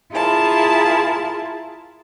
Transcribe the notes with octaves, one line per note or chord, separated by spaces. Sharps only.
E4 F4 G#4 A#4 A5